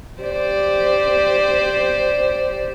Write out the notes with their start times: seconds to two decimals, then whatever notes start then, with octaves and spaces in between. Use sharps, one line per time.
0.21 G4 C5 D5